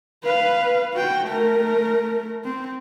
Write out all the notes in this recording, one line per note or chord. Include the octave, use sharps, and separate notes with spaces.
B4 F5
F#4 G5
A3 A#4
C4